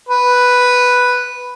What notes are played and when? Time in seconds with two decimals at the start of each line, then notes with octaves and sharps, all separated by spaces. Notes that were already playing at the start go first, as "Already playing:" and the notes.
0.09 B4